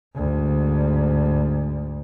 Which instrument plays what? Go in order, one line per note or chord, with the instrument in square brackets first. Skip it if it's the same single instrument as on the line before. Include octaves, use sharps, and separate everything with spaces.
[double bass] D2 G#2